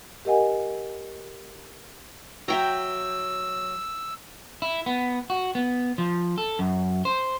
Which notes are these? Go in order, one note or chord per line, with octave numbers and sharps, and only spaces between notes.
G4 A#4 D#5 F#5 G#5
F#3 E5 G5 A#5 E6
E4
B3
F#4
B3
F3
A4
F#2
C5